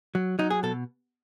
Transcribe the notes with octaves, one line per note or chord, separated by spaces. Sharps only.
F#3
F#3 D#4
G#4
B2 A4